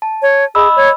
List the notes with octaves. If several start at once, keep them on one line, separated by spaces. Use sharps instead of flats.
A5
C#5
G#4 D#5 B5 E6
C#5